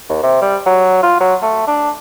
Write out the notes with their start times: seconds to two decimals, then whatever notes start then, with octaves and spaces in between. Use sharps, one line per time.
0.09 D#2
0.23 C3
0.42 G3
0.66 F#3
1.03 F4
1.20 F#3
1.42 A3
1.67 D4